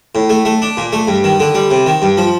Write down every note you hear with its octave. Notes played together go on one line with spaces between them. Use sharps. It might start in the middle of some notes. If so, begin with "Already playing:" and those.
A2
A3
A3
D4
A#2
A3
G2
D#3
D3
G3
C3
D#3
G2
F3